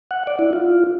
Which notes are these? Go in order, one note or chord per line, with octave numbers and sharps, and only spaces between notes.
F#5
D5
E4
F4